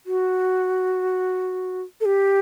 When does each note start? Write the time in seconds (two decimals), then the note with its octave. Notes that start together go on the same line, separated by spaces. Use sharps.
0.06 F#4
2.01 A4
2.05 G4